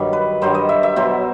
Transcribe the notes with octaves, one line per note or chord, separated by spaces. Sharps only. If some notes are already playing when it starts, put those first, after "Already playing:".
Already playing: G2 D#3 F#3
B4
G2 D#3 F#3 C5
D#5
E5
E5
B2 F#3 C5